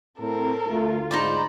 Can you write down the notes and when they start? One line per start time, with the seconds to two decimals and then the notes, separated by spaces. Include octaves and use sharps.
0.20 A2 C4 A4 A#4
0.70 D2 A3 F4
1.11 G#2 D#4 C5 D5 A#5 B5